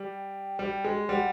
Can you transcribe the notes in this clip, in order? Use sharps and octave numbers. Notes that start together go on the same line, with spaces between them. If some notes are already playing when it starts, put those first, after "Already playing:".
Already playing: G3
G5
G3
G#3
G3 F#5